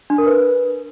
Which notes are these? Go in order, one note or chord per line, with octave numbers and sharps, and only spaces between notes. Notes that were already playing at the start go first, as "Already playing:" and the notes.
D4
A#4
B4